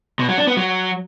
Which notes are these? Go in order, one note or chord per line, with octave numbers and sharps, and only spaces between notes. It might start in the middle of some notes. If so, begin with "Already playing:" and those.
B2
F#3
D4
B3
F#3